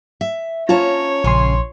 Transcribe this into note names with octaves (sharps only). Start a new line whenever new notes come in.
E5
C#4 F4 C#5 A5 A#5
A#1 C#3 C#4 G#5 C6